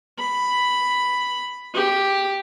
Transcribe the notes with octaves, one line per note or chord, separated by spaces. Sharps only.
B5
G4